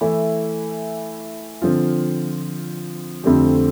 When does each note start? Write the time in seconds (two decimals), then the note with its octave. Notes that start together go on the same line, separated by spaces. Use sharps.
0.01 E3 A3 E4
1.62 D3 F3 C4 F4
3.24 F2 D3 A3 C4 G4